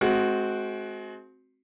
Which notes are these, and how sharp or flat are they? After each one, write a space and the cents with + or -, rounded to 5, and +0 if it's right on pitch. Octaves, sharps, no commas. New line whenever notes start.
G#3 +35 C4 +0 F#4 +0